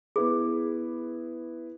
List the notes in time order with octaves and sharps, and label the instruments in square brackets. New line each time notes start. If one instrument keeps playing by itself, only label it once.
[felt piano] B3 E4 B4 [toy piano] G#4